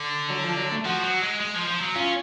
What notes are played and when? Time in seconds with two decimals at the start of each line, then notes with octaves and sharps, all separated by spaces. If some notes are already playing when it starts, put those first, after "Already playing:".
Already playing: D3
0.30 F#3
0.44 F3
0.57 F#3
0.72 A3
0.85 F3 F#4
1.04 F#3
1.22 G#3
1.40 G#3
1.55 F3
1.68 F3
1.81 F#3
1.95 C#4 F4